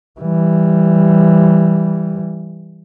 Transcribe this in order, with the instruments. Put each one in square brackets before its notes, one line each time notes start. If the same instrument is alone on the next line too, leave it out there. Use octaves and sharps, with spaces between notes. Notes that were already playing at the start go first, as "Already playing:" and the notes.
[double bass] E3 G3